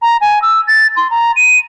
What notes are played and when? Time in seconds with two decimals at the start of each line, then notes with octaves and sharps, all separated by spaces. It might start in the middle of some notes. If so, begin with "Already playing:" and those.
0.02 A#5
0.21 G#5
0.42 E6
0.68 A6
0.96 C6
1.11 A#5
1.36 D#7